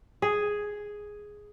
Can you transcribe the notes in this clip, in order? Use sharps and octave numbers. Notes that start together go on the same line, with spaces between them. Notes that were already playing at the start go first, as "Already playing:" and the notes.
G#4